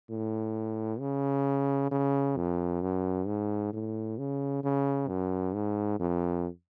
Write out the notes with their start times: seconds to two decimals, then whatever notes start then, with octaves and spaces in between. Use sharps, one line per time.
0.10 A2
1.00 C#3
1.91 C#3
2.37 F2
2.82 F#2
3.27 G#2
3.73 A2
4.18 C#3
4.64 C#3
5.09 F#2
5.54 G#2
6.00 F2